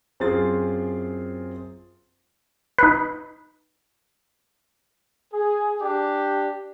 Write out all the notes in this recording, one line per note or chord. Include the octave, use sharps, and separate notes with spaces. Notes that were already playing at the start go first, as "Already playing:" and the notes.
F#2 C4 F4 G#4 C6 A6
D#4 B4
G#4
D4 G4